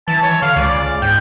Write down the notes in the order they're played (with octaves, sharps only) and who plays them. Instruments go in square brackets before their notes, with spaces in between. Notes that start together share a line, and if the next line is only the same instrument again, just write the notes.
[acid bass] E3 [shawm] A5
[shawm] C#5
[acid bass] D3 [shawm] F5
[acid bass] C#2 [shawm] D5
[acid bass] G#2 [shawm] G5